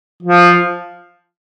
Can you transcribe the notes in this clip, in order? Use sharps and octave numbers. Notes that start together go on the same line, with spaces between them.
F3